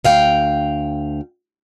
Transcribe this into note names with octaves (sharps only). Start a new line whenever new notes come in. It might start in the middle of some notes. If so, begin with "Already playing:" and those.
D2 F5 G5